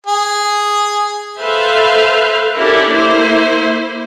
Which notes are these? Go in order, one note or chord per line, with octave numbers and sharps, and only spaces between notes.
G#4
A4 B4 C5 E5 F5
C#4 D4 E4 G4 A4 A#4
A#3 E4 C5